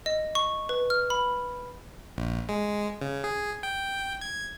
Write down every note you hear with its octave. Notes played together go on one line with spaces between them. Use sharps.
D#5
C#6
B4
F6
B5
A#1
G#3
C#3
G#4
G5
G#6